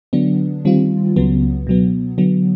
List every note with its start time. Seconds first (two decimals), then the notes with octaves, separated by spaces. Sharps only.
0.13 D3 F#3 B3 D4
0.65 D#3 G3 C4 F4
1.16 C#2 C#3 F#3 B3
1.67 B2 F#3 B3
2.18 D3 F#3 B3